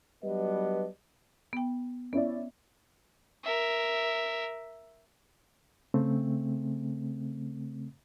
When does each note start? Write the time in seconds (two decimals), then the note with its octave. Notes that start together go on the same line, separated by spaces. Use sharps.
0.24 F#3 G3 B3 D4 B4 D#5
1.53 B3 G5
2.13 B3 C#4 E4 D5
3.44 A#4 E5
5.94 C#3 A3 C4